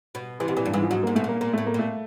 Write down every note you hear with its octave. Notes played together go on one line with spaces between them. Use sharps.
B2
C3 E3
B2
A#2 E3
G2
G#2 E3
F3
G#2 F#3
A#3
G#2
B2 A3
A#2 A#3
A#2 A#3
A3
A2
A#3
A#2 A3